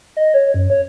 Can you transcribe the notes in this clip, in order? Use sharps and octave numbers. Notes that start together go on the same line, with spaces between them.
D#5
C#5
F#2
C#5